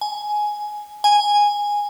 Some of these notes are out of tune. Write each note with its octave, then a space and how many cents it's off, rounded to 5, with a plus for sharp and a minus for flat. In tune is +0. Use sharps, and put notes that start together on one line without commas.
G#5 +10
G#5 -10